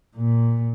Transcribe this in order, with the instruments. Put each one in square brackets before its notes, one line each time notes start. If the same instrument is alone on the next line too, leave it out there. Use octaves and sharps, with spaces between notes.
[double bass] A#2